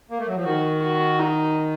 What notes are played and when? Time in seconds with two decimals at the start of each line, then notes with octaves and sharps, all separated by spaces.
0.10 A#3
0.19 A3
0.27 F#3
0.36 F3
0.44 D#3 F#4
0.82 F#4
1.20 D#4